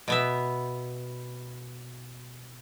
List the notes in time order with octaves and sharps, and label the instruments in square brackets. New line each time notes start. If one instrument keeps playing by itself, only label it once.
[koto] B2 B3 E5